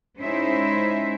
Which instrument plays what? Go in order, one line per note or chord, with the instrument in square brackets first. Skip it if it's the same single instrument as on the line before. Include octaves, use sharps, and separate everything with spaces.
[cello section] G#3 C#4 D#4 E4 C5 E5